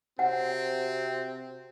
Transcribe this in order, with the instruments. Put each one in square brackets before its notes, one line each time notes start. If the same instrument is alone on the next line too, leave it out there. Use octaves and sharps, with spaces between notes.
[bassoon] C3 [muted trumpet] C4 [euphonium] F#4 [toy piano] F#5